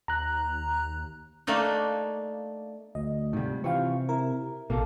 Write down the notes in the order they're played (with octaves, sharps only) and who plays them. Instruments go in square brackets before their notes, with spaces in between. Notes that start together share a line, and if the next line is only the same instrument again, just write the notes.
[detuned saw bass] D#2 [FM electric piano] A#5 F#6
[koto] A3 A#3 D4 D#4
[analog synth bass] D2 [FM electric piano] D#5
[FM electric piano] G#2 C3 [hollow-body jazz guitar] D#3 G3
[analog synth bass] C3 [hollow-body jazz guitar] E3 F4 [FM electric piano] F5 G5 C#6
[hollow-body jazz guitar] E4 [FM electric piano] A#4
[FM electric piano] A1 [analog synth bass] B2 [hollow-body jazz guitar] A#3 A4